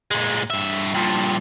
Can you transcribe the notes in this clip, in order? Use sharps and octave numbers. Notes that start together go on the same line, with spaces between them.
A#2 G#3
G2 E5
G2 A#2